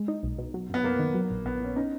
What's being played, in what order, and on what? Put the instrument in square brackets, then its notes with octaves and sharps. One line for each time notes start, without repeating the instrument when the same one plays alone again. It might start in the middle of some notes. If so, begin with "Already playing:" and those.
Already playing: [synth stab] G#3
D#4
B1
B2
F#3
[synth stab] F#2 [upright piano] B3
[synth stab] F#2 [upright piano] A#3
[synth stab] D#3
F#3
A#1
[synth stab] A#1 [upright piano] B3
[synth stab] A#2 [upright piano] C#4
[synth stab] C#4 [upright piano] D#4